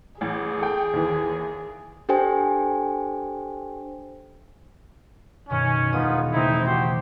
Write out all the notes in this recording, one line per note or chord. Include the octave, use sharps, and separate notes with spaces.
A1 G#4
A4 G5
D#2 E3
D4 G4 A4 C5 G5 G#5
F#2 B2 D#3 C#4
E1 G#3 B3 D#4 F4 D#6
C#3 E3 A3 C4 D#4 E4
F#4 G4 C5 G6